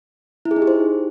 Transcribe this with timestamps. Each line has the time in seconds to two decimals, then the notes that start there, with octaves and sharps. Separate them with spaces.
0.45 E4
0.51 G#4
0.56 D#4
0.62 G4
0.67 C5